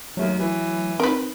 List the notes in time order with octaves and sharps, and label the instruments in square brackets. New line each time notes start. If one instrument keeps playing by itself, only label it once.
[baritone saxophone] D#2 [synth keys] F#3 A3
[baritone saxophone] E3
[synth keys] C4 D#4 [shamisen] A#4 B4